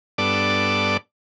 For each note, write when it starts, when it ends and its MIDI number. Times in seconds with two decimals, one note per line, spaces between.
0.18 0.97 43
0.18 0.97 59
0.18 0.97 62
0.18 0.97 69
0.18 0.97 74
0.18 0.97 86